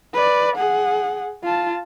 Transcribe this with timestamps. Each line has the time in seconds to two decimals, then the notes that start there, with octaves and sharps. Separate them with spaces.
0.14 B4 D5
0.57 G#4 F#5
1.44 F4 A5